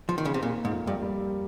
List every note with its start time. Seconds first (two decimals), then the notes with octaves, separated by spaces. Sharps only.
0.09 F3
0.18 D#3
0.25 C#3
0.34 C3
0.42 A#2 A#3
0.65 G#2
0.72 F2
0.87 G2
1.02 G3